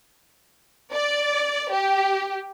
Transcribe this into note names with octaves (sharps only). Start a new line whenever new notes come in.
D5
G4